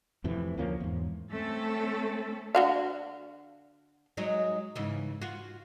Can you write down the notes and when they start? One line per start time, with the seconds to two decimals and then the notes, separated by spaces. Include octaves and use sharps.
0.24 F2 A2 C3 E3
0.58 D2 F3 A#3 C#4
0.80 E2 G#2
1.32 A3 C4 C#4 A4
2.55 D3 F#4 F5
4.17 F#3 G#3 D#4
4.76 G#2 C#3 E3
5.21 F4 F#4